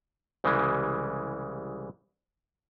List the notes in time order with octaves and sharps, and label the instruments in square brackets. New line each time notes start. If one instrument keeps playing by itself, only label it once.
[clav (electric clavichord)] C2 C#3 E3 G3 G#3